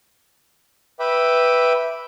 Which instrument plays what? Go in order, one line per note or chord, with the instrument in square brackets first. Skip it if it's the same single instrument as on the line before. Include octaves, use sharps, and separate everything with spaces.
[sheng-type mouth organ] B4 E5 G5 B5 D6